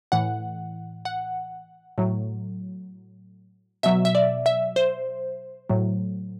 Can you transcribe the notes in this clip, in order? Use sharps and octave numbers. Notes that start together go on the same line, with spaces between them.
A2 E3 F#5
F#5
A2 F#3
B2 F#3 E5
E5
D5
E5
C5
A2 F#3